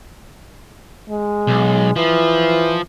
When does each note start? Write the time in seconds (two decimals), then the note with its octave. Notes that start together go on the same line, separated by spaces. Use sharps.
1.09 G#3
1.47 B1
1.96 E3 F3